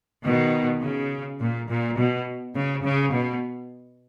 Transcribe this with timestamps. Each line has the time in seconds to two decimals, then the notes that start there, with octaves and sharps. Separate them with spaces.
0.24 B2 D#3
0.82 C#3
1.40 A#2
1.69 A#2
1.98 B2
2.55 C#3
2.85 C#3
3.13 B2